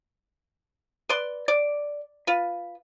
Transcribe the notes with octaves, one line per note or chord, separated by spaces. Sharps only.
B4 D5 C6
D5
F4 B4